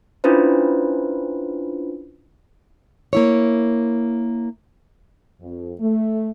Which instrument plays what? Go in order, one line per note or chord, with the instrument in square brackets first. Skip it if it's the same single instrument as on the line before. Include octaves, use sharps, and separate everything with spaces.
[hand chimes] C#4 D4 E4 F4 B4 C5
[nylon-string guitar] A#3 E4 C#5
[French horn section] F2
A3